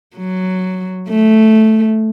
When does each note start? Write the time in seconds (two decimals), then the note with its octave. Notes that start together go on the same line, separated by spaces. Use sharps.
0.16 F#3
1.09 A3